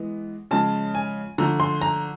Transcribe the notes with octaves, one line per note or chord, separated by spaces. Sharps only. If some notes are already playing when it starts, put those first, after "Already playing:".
Already playing: E3 G#3 B3
C#3 F3 G#3 C#4 A5
G#5
D3 F3 A3 A#5
C6
A#5